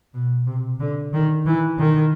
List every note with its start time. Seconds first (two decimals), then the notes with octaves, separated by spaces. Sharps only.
0.14 B2
0.47 C3
0.80 D3
1.13 D#3
1.46 E3
1.78 D#3